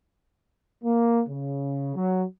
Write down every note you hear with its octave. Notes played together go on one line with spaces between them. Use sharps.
A#3
C#3
F#3